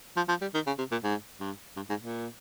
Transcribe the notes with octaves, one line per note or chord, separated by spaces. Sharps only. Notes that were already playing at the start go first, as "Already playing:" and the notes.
F3
F3
G3
D#3
C#3
C3
A#2
G#2
G2
G2
G#2
A#2